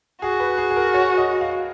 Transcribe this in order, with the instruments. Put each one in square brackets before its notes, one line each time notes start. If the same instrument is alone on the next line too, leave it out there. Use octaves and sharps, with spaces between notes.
[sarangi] F#4 [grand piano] G#4
[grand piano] B4
G#4
G#4
A#4
C#5
D#5
F5